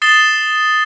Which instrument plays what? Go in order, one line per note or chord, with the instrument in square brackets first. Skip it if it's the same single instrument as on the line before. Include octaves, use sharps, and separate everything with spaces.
[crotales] D#6 A6 C7 E7 G7